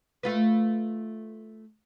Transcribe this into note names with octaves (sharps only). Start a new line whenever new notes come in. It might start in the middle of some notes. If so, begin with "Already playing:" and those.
A3 F4 B4